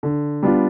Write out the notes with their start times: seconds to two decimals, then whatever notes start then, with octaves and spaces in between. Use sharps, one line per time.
0.03 D3
0.43 G3 B3 D4 F4